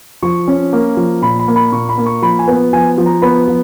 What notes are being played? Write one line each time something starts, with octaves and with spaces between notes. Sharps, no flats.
F3 C#6
C#4
A#3
F3
A#2 B5
B5
A#3
B5
A#2 C#6
B5
A#3
C#6
F3 B5
G#5
B3
F3 G#5
F3
A#5
B3 B5
F3